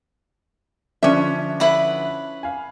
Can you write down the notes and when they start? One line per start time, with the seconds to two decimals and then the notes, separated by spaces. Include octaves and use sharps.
1.03 D3 F3 C#4 D4 E5
1.60 E4 B4 F#5
2.43 F5 G#5